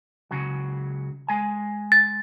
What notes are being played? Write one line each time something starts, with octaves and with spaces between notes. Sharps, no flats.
C#2 C#3 F#3
G#3 G#5
A6